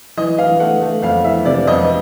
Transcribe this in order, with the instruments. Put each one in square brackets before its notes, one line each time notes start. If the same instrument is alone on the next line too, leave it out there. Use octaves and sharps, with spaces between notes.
[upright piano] E3 D#5
E3 F5
A3 F#5
A3
F2 F5
E3 E5
C3 D5
F2 D#5